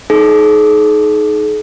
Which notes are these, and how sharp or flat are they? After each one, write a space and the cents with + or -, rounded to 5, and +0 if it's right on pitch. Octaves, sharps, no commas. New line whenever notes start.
D#4 +0 G#4 +45